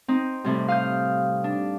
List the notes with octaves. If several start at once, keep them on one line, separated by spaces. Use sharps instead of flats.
C4 D#4
A2 C3 G3
F5 D#6 G6
D4